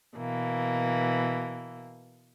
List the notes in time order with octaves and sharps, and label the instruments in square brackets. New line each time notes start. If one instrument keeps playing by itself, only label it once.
[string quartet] B2 E3 A#3